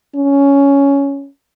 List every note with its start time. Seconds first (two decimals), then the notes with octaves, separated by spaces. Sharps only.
0.16 C#4